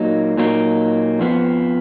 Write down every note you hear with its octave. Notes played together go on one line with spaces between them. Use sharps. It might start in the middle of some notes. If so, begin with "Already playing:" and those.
Already playing: A#2 F#3 A#3 D#4
A#2 F#3 A#3 D#4
F2 F3 B3